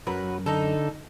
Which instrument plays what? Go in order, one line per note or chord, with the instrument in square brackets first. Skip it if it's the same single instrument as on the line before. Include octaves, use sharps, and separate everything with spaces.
[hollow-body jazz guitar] F#2 A#4 A#5 [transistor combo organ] F#3 [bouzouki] B4
[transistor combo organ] D3 [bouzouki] D#4 A4